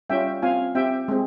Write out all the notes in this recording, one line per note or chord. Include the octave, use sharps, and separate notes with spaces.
G3 C#4 F4 E5 G5
C4 F4 F5 G#5
C4 G4 E5 G5
G#3 C4